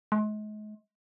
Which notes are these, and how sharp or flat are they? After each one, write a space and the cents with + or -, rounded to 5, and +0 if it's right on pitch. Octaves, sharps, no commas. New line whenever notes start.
G#3 +40